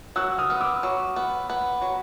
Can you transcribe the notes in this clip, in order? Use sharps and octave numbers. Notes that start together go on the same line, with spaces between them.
F#3 E6 F#6
D#6 F6
B3
D6 E6
F#3
B3
B3
F#3